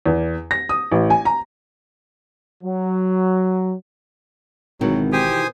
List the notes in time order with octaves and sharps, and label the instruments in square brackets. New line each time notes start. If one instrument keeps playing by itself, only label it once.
[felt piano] E2
A#6
D#6
A1
G#5
A#5
[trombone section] F#3
[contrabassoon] G#1 [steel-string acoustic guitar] B2 D#3 E3 [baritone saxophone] F#3
[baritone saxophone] G4 [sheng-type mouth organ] C5 G#5 D#6